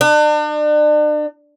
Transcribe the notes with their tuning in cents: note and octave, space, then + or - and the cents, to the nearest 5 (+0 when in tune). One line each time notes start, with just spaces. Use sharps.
D4 +40